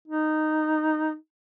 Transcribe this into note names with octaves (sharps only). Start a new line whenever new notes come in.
D#4